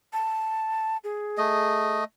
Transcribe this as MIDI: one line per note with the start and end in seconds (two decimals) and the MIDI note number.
0.13 0.97 81
1.04 1.98 68
1.38 2.04 57
1.38 2.04 75